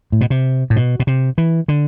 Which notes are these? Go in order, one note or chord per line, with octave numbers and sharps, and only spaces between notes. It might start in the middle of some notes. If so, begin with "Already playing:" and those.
A2
B2
C3
A2
B2
B2
C3
E3
D3